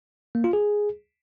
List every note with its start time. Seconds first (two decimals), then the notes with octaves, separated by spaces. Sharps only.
0.35 A#3
0.44 F4
0.53 G#4